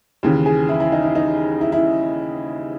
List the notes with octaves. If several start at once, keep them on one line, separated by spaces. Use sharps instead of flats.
D#2 C#3 E3
G#4
E4
E4
D#4
E4
D#4
E4
E4